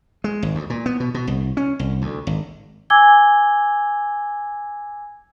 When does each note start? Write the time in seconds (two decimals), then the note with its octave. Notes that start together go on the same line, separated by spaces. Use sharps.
0.24 G#3
0.43 G#1
0.55 D2
0.70 A#2
0.86 B3
1.00 B2
1.14 B2
1.27 C2
1.57 C#4
1.79 C2
2.02 D2
2.27 G#1
2.90 G#5 D6 E6 G#6 G7